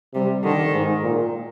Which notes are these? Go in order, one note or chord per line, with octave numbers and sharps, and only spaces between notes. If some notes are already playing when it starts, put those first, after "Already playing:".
C3 G3
D3 D#3
G#2
A#2